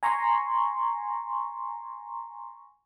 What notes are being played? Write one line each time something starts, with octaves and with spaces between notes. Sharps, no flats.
G#5 A#5 C6 C#6